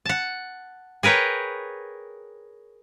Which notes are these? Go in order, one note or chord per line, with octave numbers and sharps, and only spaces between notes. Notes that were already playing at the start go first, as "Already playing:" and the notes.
F#5 A5
G#4 A#4 B4 C#5 G5